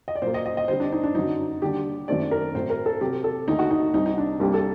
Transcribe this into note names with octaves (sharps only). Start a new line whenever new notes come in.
D#5
D5
A#2 F#3 A#3 C5
D#5
D#5
D#5
G2 D3 G3 C4 C5
D4
D#4
D4
F#2 D3 F#3 D#4
D#2 D3 G3 D4 G4
F#2 D#3 A3 C4 D5
A#4
A2 F#3 C4 C5
A#4
A4
C3 F#3 C4 G4
A4
D#2 D3 A3 D#4
F#4
D#4
C2 C3 G3 D#4
D#4
D4
C2 C3 G3 A#3 D4 G4
A4